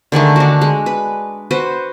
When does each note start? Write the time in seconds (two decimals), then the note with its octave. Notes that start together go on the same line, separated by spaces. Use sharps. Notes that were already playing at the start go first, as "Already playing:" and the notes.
0.12 D3 D#3 G#3 A3
0.36 D4 F#4
0.61 G#3
0.86 B4
1.51 F#4 B4 C5